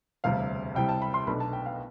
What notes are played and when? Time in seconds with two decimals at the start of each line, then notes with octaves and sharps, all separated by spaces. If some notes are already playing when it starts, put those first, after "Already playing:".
0.24 E1 D2 C3 G3 F5
0.75 C2 C3 G3 G5
0.89 A5
1.02 B5
1.14 C6
1.27 B1 B2 A3 D4 B5
1.40 A5
1.53 G5
1.66 F5